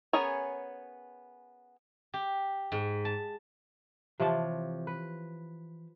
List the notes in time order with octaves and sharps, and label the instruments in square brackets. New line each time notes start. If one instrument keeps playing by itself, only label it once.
[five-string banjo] B3 C#4 G#4 A#4 C#5
[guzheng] G4
G#2
A5
[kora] C3 F3 C#5 [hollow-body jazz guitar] E3 A5
[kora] B4